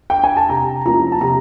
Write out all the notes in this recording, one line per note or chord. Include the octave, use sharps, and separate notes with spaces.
G5
G#5
A5
C3 A#5
F3 A#3 C#4 E4 A#5
A5
C3 A#5